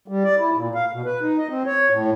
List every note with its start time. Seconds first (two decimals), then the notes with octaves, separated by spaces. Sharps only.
0.08 G3
0.24 D5
0.38 E4
0.54 A#2
0.75 F5
0.92 B2
1.05 B4
1.21 D#4
1.38 D#5
1.50 C4
1.66 C#5
1.90 A2